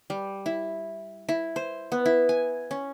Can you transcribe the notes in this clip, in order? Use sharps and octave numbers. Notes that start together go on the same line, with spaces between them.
G3
E4
E4
C5
B3
E4
G#5
C#4